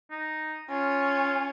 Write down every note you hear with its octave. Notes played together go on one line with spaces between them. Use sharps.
D#4
C#4 F4